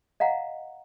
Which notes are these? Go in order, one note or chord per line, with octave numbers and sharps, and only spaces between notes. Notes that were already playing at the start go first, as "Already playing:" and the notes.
D#5 F5 F#5 A#5